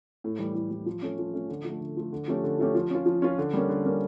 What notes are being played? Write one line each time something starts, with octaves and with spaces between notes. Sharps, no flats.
A2
E3 G3
A2
E3 G3
F3
A3 C#4
F3
A3 C#4
D3
F3 A3
D3
F3 A3
D3
F3 A3 C#4 G4
D3
F3 A3 C#4 G4
F3
C#4 F4
F3
C#4 F4
D3
G3 A#3 C#4
D3
G3 A#3 C#4